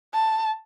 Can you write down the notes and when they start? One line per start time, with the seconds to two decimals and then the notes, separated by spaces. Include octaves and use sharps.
0.13 A5